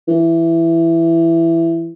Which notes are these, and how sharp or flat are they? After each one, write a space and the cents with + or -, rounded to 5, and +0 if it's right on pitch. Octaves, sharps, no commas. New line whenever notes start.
E3 +10